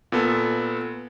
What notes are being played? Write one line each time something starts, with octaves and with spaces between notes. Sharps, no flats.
A#2 B3 A4